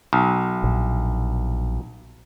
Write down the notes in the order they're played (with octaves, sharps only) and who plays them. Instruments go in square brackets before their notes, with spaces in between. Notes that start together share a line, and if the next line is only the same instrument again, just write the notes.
[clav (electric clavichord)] B1
[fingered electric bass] A#1